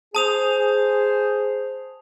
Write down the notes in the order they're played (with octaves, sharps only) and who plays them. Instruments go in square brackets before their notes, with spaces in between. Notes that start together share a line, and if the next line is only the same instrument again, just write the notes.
[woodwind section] G#4 C5 [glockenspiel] A5 D#6 F7